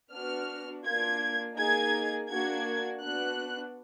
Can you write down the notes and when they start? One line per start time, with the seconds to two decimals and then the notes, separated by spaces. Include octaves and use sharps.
0.12 B3 D4 F#4 F6
0.84 A#3 D4 F4 G#6
1.57 A#3 D#4 G#4 G#6
2.29 A#3 D4 F#4 G#6
3.02 B3 D4 F#4 F#6